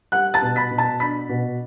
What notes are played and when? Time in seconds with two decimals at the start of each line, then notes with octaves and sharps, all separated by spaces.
0.12 G3 F#5 F#6
0.34 A5 A6
0.42 B2
0.56 B5 B6
0.71 B2
0.78 A5 A6
1.00 D4 B5 B6
1.29 B2